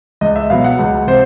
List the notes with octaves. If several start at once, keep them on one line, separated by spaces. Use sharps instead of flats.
C#2 D#5
E5
B2 F#3 B3 F5
F#5
C#2 F#5
C3 C5